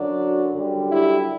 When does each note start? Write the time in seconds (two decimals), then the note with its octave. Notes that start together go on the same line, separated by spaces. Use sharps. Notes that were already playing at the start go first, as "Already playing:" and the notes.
Already playing: F#2 D3 F#3 D4 F#4
0.52 F#2 D3 G3
0.90 E4 G4